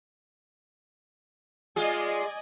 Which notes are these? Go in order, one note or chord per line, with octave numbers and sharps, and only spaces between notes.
G#3 F4 G#4 D5 D#5 G#5